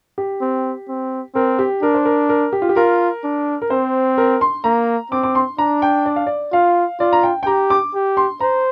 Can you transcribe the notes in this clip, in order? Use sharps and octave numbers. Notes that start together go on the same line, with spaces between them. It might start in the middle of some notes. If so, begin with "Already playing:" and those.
G4
C4
C4
C4 A#4
G4
D4 A#4
C5
A#4
A#4
G4
F4
G4
F4 A#4
D4
A#4
C4 C5
A#4
C6
A#3 A#5
C4 D6
D6
C6
D4 A#5
G5
D5
F5
D5
F4 F5
F4 D5
A#5
G5
G5
G4 A#5
D6
G4
C6
C5 A#5